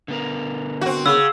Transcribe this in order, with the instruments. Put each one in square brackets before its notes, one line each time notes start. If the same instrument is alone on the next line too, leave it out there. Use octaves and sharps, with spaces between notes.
[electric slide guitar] D3 B3 A#4
[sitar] C4 F#4
[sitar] C#3 [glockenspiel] E6